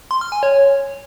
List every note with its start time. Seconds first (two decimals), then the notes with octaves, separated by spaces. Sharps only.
0.11 C6
0.21 F6
0.32 G#5
0.43 C#5